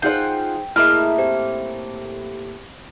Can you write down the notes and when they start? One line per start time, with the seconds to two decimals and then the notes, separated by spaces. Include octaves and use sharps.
0.02 D#4 F4 G#4 C5 F#5 G5
0.76 A2 A#3 E4 G#4 D#5 E5 B5 F6
1.18 C4 G4